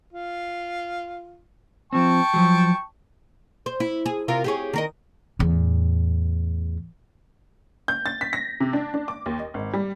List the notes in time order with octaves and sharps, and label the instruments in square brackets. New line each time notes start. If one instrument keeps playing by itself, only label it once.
[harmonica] F4
[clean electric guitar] F3 C4 [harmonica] G5 A5 C#6
[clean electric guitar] F3 F#3
[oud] C5
E4
G#4
C3 F4 A#4
G4 G#4 C#5
D#3 A#4 D#5
[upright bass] E2 A2
[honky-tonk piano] G6
A6
B6
A#6
C3
D4
D4
D6
D#2
D#5
G#1
G3